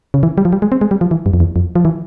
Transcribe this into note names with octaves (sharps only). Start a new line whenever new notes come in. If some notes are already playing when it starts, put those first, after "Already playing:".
C#3
E3
G3
F3
G3
G#3
C4
G#3
G3
F3
E3
G2
F2
E2
F2
F3
E3